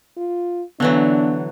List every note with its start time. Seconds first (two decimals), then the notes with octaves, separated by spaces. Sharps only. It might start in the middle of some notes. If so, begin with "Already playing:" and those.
0.17 F4
0.80 D3 E3 F#3 B3 D4